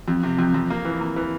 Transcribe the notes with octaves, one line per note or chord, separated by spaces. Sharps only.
F2
C3
F2
F2
A#3
E3
A#3
E3